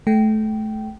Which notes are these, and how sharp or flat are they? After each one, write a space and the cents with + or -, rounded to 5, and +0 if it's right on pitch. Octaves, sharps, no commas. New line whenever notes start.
A3 -25 G5 -15